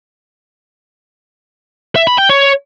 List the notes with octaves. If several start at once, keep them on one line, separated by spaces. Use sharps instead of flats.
E5
B5
G5
C#5